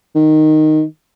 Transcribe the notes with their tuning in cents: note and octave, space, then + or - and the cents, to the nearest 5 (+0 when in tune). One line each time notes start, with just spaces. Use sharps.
D#3 -5